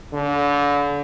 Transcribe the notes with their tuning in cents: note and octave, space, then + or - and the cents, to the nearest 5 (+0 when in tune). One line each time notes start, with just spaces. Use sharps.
D3 -35